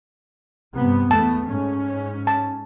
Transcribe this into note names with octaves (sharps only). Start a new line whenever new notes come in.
G2 C3 B3
E2 A3 B3 A5
G#2 C#4
A5